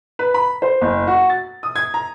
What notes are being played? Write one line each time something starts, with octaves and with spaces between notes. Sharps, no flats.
B4
B5
C5
F#1
F#4
A6
D#6
G#6
A#5